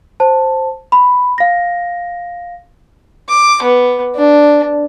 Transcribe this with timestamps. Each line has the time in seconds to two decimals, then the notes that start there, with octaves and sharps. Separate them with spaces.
0.20 C5 A5
0.92 B5
1.38 F5 A#6
3.29 D6
3.62 B3
4.16 D4